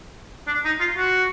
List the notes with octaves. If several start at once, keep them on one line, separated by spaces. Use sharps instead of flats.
D4
D#4
F4
F#4